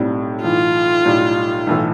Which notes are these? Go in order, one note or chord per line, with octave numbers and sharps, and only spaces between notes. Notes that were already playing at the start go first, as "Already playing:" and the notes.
Already playing: B1 A2 G3 C4
B1 A2 E3 F4
B1 A2 G3
B1 A2 E3 A3